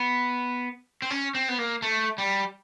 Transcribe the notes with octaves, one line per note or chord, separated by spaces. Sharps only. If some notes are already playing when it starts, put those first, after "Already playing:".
Already playing: B3
C4
C#4
C4
B3
A#3
A3
G3